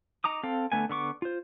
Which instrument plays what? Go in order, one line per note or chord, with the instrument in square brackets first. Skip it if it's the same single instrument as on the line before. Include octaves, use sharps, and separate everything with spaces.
[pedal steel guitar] D#4 A#5 D6 D#6
C4 A4 F5
D3 A3 B3 G#5
D3 B3 C#6 D6
F4 C5